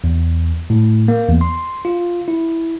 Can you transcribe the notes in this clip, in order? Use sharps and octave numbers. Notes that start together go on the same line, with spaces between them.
E2
A2
A#3
E2
C6
F4
E4